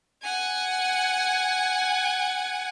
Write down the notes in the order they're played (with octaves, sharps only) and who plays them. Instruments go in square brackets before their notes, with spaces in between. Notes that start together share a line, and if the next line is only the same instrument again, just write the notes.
[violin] F#5 G#5